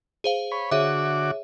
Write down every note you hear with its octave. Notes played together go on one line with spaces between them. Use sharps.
G#4 C5 F5
C#5 B5
D3 F#4 G#4 C#5 E5 D6